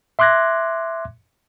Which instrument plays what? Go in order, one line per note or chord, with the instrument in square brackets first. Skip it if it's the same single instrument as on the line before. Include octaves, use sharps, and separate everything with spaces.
[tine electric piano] E5 C6 D6 F#6 G#6 A#6